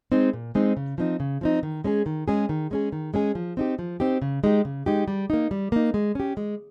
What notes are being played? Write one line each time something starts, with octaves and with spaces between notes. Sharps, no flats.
G#3 C4 D#4
A#2
G#3 C4 D#4
C#3
F3 C4 D#4
C#3
F3 C4 D#4
D#3
G#3 C#4 G#4
D#3
G#3 C#4 G#4
D#3
G#3 C#4 G#4
D#3
G#3 C#4 G#4
F3
C4 D#4 G4
F3
C4 D#4 G4
C#3
G#3 D#4 G4
C#3
G#3 D#4 G4
G3
A#3 D#4
G3
A#3 D#4
G#3
C#4 G4
G#3